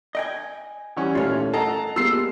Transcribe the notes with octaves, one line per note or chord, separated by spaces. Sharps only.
D#5 G5 G#5
E3 G3 C#4 D5 F#5 C#6
A#1 D#2 A3 F4 C#5 F5
A4 D#5 F#5 A5 A#5 C7
G3 G#3 A#3 B3 F4 E6 C7